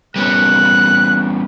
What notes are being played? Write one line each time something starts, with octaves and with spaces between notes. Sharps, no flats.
G3 B3 C#4 F#6